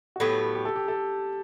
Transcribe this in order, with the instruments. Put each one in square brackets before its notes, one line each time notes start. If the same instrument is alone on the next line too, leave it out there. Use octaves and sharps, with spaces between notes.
[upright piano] F#4
[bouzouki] A2 F#3 B3 [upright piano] G4
[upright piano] G4
A4
G4
A4